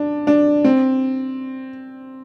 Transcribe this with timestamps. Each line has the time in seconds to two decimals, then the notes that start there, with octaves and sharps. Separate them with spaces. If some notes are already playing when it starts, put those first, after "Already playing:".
Already playing: D4
0.27 D4
0.64 C4